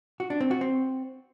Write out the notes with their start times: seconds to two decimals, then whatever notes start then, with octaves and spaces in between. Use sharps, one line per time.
0.20 F#4
0.30 D4
0.41 C4
0.51 F#4
0.61 C4